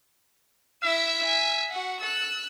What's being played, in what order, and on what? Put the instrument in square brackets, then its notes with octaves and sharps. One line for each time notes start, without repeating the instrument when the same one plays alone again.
[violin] E4 E6 [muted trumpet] E5
[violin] G#5
F#4 F#5
[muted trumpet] A4 [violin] E6 F#6